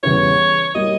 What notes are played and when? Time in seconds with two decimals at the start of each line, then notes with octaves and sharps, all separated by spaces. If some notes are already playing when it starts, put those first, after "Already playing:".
0.03 E2 C#3 G3 B3 E4 C#5
0.75 G3 A#3 E4 D#5